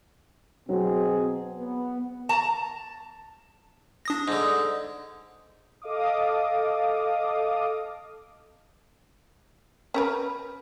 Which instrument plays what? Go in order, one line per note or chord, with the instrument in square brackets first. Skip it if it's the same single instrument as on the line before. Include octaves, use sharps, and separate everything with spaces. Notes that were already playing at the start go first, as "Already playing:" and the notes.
[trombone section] B2 C4 G#4 [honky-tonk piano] F#3
[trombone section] B3
[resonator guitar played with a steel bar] A5 A#5
[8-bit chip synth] D4 D#6 A#6
[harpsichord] G#2 D3
[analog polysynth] A4 D#5 F5 D6 D#6
[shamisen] C#4 A#4 B4